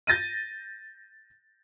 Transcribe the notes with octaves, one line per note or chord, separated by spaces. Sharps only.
G6 A6 A#6 D#7